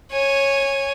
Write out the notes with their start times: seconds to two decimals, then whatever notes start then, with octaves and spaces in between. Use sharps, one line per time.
0.12 C#5 G#5